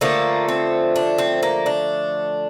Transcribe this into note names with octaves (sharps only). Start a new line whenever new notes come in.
D3 F3 A3 A#3
C4
D4
C4
A#3
D4